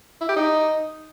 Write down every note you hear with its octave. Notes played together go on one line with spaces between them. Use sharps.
E4
G4
D#4